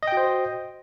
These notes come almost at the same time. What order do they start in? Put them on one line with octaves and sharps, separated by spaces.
D#5 G5 F#4 C5